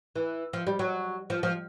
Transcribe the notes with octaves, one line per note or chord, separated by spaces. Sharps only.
E3
F3
G3
F#3
F3
F3